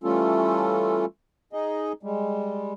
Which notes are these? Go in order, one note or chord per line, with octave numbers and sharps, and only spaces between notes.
E3 G3 A3 C#4 F4 A4
D#4 G#4 D#5
G3 G#3